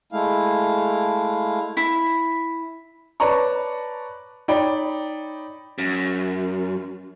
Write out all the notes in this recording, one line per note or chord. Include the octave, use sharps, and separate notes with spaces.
G#3 A3 E4 F5
E4
B4 C#5 D5 A5 A#5 C#6
D#4 C#5 D5 G5 B5
F#2